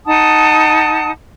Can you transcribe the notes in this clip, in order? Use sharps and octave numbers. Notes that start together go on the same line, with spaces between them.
D#4 F#5 A5 D#6